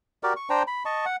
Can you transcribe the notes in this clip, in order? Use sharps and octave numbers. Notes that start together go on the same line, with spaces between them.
F#4 G4 A#4 D5
C#6
D4 C5 G5 A#5
B5
D#5 A5 C#6
F#5